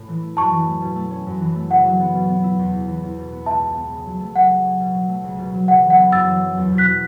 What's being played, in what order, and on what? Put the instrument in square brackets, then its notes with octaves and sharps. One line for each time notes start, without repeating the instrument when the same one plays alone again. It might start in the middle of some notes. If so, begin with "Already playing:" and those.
Already playing: [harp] A2 C#4
E3
A3
[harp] F#2 [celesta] A5 C#6
[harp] E3
A3
B2
A3
C#4
F#2
E3
A3
[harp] C#3 [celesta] F#5
[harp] F#3
B3
B2
B3
E4
E2
C#3
E3
E2
B2
B3
[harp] C#2 [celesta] E5 A5
[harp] B2
B3
C#3
F#3
A3
[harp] C#3 [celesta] F#5
[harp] F#3
C#4
B2
F#3
A3
C#2
B2
F#3
[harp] C#3 [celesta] F#5
[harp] E3
[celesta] F#5
[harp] B3
[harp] F#2 [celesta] E6 A6
[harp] F#3
C#4
E2
B2
[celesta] F#6 B6
[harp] F#3